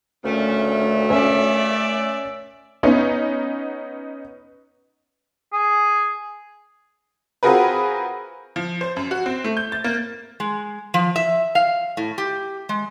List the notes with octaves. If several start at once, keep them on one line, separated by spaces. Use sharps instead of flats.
D2 A#2 C#3 A3 C#4
C#4 C#5 D5 E5
B3 C#4 D#4
G#4
C4 F4 F#4 G#4 A#4 B4
F3
C5
F#2
F#4
C4
A3
G6
A6
A#3
G#3
F3
E5
F5
A2
G4
G#3